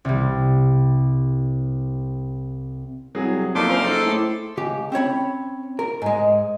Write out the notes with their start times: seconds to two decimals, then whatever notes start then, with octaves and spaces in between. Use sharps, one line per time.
0.05 C2 G3
3.15 C2 F#3 G#4
3.55 F2 A#2 D#3 A4 C6 D6
3.69 F#1 C#4 F4 A#4 C5
3.83 D#4 G#4 A4
4.06 A2
4.57 C#2 G4
4.92 C4 C#4 C#5 B5
5.79 A#4
6.02 G#2 G#3